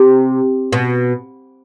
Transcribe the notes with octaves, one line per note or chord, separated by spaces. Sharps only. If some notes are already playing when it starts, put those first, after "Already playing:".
Already playing: C3
B2